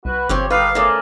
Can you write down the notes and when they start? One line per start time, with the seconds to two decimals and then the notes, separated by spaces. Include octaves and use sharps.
0.05 C2 F#4 B4
0.29 G1 F2 F3 C4 G4 C#5
0.50 D3 D#3 G3 B4 F5
0.75 C#3 A3 G#4 A#4 D5